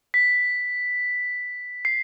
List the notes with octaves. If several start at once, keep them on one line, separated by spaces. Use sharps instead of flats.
B6
C7